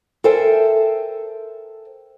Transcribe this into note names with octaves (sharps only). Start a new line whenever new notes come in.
A4 A#4 C5 E5 G5 G#5